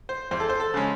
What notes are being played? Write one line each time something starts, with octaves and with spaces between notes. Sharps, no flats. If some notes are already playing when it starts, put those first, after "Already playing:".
C5
E2 C5
A4
C5
A4
C#3 G#3 C#4